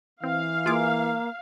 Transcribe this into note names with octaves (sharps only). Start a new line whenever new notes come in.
E3 C4 F5
A#3 F4 G#4 D6